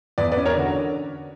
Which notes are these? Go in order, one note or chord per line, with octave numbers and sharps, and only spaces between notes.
E2 B4 D5
B4 D5
C#4
A#4 C#5
D3 F#4